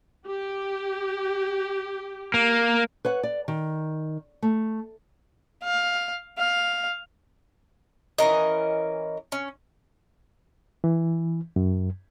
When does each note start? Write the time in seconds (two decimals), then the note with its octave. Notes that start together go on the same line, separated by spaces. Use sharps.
0.26 G4
2.34 A#3
3.05 B4 C#5 F#5
3.23 D5
3.48 D#3
4.42 A3
5.64 F5
6.38 F5
8.18 E3 C#4 A#4 D#5
9.32 C#4
10.84 E3
11.56 F#2